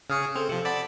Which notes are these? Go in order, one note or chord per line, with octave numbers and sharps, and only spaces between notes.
C#3 G#4 C#6 D#6 F6 C#7
C4 A4 C#7 F7
C3 F3 C#7 E7 F#7
D5 F#5 A5 B5